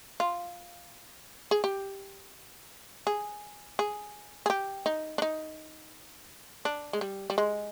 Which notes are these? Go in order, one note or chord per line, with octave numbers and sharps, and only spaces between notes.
F4
G#4
G4
G#4
G#4
G#4
G4
D#4
D4
D#4
D4
G#3
G3
G3
G#3